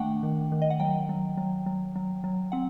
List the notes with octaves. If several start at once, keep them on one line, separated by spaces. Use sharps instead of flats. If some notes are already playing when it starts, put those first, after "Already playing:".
Already playing: D#3 A3 D4 F#5 G5
D#3
D#3
D#5
F#5
F#3 G5
F#3
F#3
F#3
F#3
F#3
C4 F#5